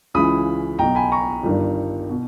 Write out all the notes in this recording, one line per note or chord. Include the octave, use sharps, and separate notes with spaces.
C#2 C#3 E3 B5 D#6
B1 B2 G5 A#5
G#5 B5
A#5 C#6
G1 G2 D#3
B2